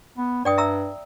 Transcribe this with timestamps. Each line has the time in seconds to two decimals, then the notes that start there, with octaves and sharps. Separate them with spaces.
0.18 B3
0.45 G2 D5 G5 D#6
0.58 E5 A#5 E6